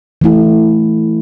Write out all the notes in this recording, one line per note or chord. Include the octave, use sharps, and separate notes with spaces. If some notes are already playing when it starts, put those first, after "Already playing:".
E3 A3 E4